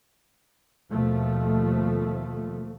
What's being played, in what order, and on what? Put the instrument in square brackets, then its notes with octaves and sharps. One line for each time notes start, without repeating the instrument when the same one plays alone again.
[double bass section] D#2 B2 F3 A3